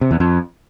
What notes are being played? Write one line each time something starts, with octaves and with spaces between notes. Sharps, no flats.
C3
E2
F2